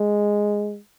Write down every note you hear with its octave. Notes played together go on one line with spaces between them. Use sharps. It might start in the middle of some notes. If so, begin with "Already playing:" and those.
Already playing: G#3